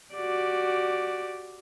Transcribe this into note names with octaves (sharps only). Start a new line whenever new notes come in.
F#4 G4 D5